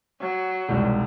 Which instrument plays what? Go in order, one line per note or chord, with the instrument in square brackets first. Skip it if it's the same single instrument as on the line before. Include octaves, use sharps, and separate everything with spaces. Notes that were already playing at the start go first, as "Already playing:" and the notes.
[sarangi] F#3
[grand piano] E1 C2 G#2